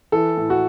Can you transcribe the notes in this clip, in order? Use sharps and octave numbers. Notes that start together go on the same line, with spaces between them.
E3 A4
A2
F#4